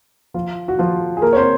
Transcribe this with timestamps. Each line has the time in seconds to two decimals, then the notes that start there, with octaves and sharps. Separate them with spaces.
0.34 F3 F4
0.68 F#4
0.79 F3 F4
1.17 G#4
1.22 A#3 A#4
1.33 C#5
1.37 C4 C5